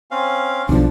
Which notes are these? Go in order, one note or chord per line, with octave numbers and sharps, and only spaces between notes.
C4 C#4 F5
B1 F2 F3 D4